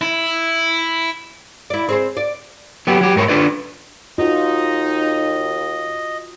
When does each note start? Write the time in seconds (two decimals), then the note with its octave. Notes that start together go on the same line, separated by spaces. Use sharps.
0.01 E4
1.70 E4 D5
1.89 C4 G#4 C5
2.17 D5
2.87 F#3 B3 G4
3.01 F#3 G4
3.16 G#2 A#4 C#5
3.28 D4 F4 B4 D5
4.18 D#2 D#4 F4 F#4 D#5